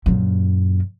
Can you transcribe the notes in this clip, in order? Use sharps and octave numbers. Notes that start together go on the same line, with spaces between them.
F#2 A#2